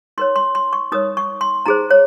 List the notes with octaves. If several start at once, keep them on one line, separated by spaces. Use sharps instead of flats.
D#4 A#4 C#5 C6
C6
C6
C#6
D#4 A#4 C#5 D#6
C#6
C6
D#4 G#4 C5 A#5
C#5